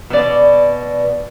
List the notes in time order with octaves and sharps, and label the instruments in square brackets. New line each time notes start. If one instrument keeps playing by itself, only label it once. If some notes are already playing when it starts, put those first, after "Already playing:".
[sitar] B2 D5